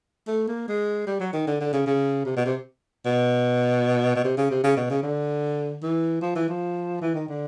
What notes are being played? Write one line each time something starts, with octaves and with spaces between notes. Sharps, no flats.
A3
A#3
G#3
G3
F#3
D#3
D3
D3
C#3
C#3
C3
B2
C3
B2
B2
C3
C#3
C3
C#3
B2
C#3
D3
E3
F3
E3
F3
E3
D#3
D3